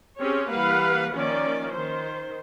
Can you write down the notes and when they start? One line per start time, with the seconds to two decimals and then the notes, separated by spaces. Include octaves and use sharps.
0.18 C4 C#4 G4 G#4 C#5
0.49 E3 G3 A#3 B4 F5 F#5
1.13 D#3 F3 A#3 C#4 D5
1.73 D#3 C5